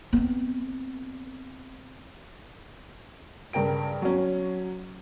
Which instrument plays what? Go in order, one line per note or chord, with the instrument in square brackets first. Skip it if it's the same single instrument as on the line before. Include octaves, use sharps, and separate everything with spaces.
[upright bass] B3 C4
[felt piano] G2 C#3 A#4 G5 D7
F#3 C#4